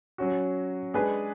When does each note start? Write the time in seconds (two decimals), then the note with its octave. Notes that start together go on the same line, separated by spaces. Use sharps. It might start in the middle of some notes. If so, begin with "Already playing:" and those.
0.18 F#3 C#4 F#4
0.94 G#3 D4 G#4 B4